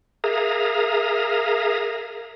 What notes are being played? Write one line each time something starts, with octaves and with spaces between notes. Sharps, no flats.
G#4 A#4 E5 F5 A#5 D#6